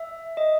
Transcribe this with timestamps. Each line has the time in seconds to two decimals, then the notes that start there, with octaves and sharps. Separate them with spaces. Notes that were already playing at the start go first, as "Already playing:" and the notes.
Already playing: E5
0.37 D#5